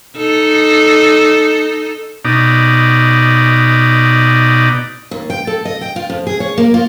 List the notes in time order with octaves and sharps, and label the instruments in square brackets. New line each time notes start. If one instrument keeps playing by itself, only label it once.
[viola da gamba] D#4 A4
[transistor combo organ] B2 D#4 D5
[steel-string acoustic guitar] D#2
G5
A4
D#5
G5
F4
F2
G#4
C#5
A#3
F4